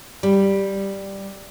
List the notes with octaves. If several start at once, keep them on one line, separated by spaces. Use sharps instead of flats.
G3